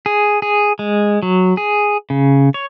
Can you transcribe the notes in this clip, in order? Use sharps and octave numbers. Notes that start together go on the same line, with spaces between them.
G#4
G#4
G#3
F#3
G#4
C#3
C#5